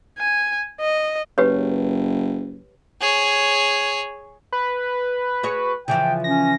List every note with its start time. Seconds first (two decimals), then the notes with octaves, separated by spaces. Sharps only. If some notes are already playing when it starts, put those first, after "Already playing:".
0.18 G#5
0.80 D#5
1.38 F#1 G4 B4 C#5
3.01 G#4 C#5
4.53 B4
5.43 F#4 G#4 C#5
5.88 C#3 E3 F3 G5
6.24 C#4 A#6